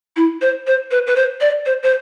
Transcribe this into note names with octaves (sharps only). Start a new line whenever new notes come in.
E4
C5
C5
B4
B4
C5
D5
C5
C5